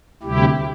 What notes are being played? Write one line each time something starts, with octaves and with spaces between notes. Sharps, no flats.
D2 C3 G3 E4 G4